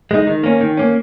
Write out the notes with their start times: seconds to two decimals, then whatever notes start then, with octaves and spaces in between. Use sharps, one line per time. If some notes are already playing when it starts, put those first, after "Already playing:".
0.11 G#3 D#4
0.27 D#3
0.44 A#3 C#4
0.61 D#3
0.77 A#3 C#4